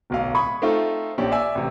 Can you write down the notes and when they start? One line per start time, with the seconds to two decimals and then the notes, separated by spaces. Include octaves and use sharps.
0.10 D1 B1 F5
0.35 B5 C#6 D#6 G#6
0.62 A3 C4 D#4 F4 A4
1.18 A#1 C#4 D4 G4
1.32 D5 E5 G#5
1.55 A1 C3